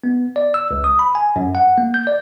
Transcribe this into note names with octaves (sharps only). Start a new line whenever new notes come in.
B3
D5
E6
C#2
D#6
B5
G#5
F#2
F#5
A#3
G6
D5